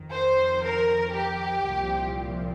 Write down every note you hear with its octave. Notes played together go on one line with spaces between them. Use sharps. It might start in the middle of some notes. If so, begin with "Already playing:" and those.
Already playing: F2 D#3
C5
A#4
G4
C2 A#2 F3